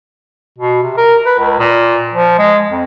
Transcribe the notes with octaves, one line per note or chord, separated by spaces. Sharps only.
B2
C3
A#4
B4
C#2
A#2
F3
G#3
F2